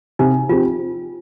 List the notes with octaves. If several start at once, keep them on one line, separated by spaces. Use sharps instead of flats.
C3 D#4
F3 C4 F4 G4